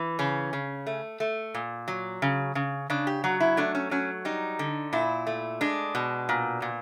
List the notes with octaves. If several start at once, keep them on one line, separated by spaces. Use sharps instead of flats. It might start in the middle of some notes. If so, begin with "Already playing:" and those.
Already playing: E3
C#3 C#4
C#3
A3
A3
A#2
F#3
C#3
C#3
C#3 D4
G4
F#3 F#4
E4
A3 D4
C#4
F#3 C#4
G3 D#4
D3
A#2 E4
A3
G#3 D4
B2
A#2
A#2